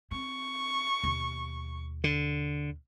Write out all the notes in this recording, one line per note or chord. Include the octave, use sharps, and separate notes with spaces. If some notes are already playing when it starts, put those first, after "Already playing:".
C4 C#6
D#2 B2
D3